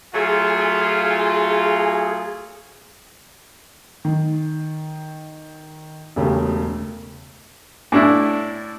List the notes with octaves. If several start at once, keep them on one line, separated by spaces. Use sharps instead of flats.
F#3 A3 F4 G#4
D#3
E1 C#3 A3 G4
A2 D4 E4